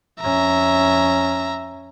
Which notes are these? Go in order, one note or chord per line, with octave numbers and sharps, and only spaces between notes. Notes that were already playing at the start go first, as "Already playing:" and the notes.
F2 C#4 E5 A#5